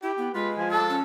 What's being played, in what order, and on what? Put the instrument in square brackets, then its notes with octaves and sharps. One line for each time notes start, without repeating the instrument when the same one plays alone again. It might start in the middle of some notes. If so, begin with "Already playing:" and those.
[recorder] E4 [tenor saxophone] G4
[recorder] B3
[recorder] G#3 [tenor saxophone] F4 [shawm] B4
[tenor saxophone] F3 [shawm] G#5
[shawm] A4 [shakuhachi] A5
[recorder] C#4